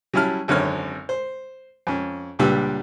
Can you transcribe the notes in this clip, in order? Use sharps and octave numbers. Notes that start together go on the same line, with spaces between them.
F#3 G3 C#4 E4 A5 F6
G#1 F#2 D3 C4 C#5 F6
C5
F2 C#4
C#2 A#2 G3 D4 B4 E6